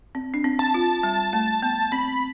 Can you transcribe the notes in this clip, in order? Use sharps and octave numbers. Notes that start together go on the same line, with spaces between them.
C4
D4
C4
A5
F4
G3 A5
A3
B3
C4 B5